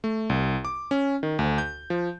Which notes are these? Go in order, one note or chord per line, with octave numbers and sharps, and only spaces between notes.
A3
C2
D6
C#4
D#3
D2
G6
F3